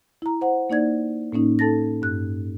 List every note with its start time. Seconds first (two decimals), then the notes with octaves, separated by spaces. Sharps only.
0.22 E4 A#5
0.41 C5 F#5
0.70 A#3 D#4 D5 G#6
1.32 A2 A#3 C#4 D#4
1.59 D#4 A4 A5 A6 A#6
2.02 G2 F#6